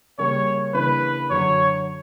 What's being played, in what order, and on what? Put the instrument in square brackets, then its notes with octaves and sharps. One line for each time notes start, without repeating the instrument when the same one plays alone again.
[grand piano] C#3 G3 A#3 C#4 [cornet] C#5
[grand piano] C#3 E3 A#3 D4 [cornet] B4
[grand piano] F#2 D3 F#3 [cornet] C#5